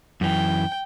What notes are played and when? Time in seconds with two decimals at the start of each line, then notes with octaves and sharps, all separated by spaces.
0.21 F#2 E3 G5